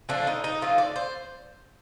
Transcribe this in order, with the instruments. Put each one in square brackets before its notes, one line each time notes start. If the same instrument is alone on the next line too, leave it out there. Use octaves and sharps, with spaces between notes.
[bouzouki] D3 F3 A3 D4
D#4
D#4
D3 F3 A3 F4
D5
C5